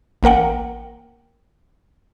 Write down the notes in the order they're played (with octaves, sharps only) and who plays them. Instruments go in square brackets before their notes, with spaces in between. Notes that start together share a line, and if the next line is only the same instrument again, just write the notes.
[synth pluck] A1 A#3 A#4 F#5 G5